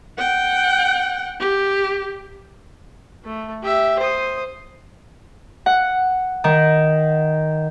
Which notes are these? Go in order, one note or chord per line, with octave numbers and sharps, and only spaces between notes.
F#5 G5
G4
A3
G4 E5
C5 D#6
F#5
D#3